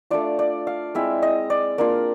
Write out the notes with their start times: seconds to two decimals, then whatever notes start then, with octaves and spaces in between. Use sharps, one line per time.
0.10 A3 D4 F4 D5
0.39 D5
0.67 F5
0.95 G#3 C4 E4 E5
1.22 D#5
1.50 D5
1.78 A#3 D4 F4 D5